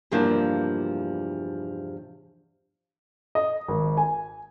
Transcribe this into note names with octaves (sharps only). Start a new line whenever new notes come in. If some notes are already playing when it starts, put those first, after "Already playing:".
E2 G2 C3 F3 A#3 D4
D#5
G#1
G#5